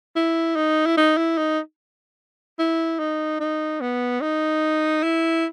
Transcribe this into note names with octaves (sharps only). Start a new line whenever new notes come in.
E4
D#4
E4
D#4
E4
D#4
E4
D#4
D#4
B3
D#4
E4